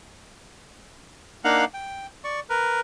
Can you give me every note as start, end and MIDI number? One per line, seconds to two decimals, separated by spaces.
1.44 1.65 58
1.44 1.65 62
1.44 1.65 63
1.44 1.65 77
1.44 1.65 78
1.74 2.07 79
2.24 2.40 74
2.24 2.40 85
2.50 2.80 70
2.50 2.80 71